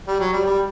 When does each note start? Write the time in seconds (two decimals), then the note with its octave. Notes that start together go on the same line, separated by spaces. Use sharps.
0.07 G3
0.20 F#3
0.33 G3
0.46 G3